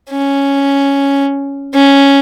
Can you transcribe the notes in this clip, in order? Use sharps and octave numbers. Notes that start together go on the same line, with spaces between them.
C#4
C#4